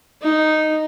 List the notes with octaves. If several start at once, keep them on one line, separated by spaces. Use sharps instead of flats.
D#4